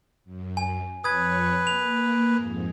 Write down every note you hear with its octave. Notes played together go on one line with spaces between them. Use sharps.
F#2
G#5
F2 B4 C#5 D#6 G#6
A#3 F7
F2 G#2